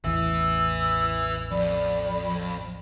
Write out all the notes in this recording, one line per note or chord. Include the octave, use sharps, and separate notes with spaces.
A1 E2 E3 B4 E5 E6
F2 D5 B5